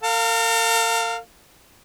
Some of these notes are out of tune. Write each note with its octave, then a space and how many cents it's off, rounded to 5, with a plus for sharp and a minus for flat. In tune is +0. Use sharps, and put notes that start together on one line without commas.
A#4 -45 F5 +5